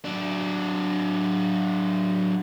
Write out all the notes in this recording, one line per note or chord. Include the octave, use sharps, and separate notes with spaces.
F#3 D4